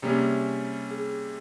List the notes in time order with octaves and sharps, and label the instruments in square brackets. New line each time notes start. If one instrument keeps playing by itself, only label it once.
[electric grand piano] C3 G3 C#4 G#4 [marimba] A#3
[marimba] G#4